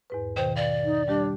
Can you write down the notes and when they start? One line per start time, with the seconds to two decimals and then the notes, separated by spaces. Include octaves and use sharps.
0.10 E2 G#2 B4
0.36 B2 D#3 C5 G5
0.56 D5 F5
0.85 D#4
1.08 G3 D4 G4